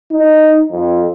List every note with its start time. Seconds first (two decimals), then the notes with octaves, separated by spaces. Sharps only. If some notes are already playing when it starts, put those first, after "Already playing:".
0.11 D#4
0.72 F2